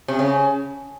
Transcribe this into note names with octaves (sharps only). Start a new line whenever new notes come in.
C3
C#3